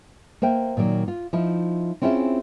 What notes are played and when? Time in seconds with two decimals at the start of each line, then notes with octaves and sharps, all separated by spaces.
0.42 A#3 C5 E5 G5
0.77 A#2 D#3 F#3 D5
1.08 F4
1.33 F3 D#4 E4
2.02 C4 C#4 E4 F4 G#4 E5